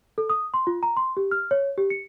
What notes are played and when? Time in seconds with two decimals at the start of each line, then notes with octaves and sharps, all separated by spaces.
0.18 A4
0.30 D#6
0.54 C6
0.67 F4
0.83 A#5
0.97 C6
1.17 G4
1.31 F6
1.51 C#5
1.78 G4
1.90 C#7